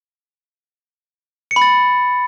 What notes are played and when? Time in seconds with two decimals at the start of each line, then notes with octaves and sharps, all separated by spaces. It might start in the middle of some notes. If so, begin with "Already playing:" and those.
1.51 C#7
1.56 B5
1.62 A6